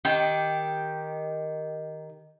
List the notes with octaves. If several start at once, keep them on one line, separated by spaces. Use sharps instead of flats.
D#3 G4